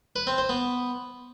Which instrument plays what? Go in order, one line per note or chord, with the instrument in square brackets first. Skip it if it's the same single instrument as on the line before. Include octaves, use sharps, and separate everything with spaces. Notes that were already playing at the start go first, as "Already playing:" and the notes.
[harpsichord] B4
C4
C5
B3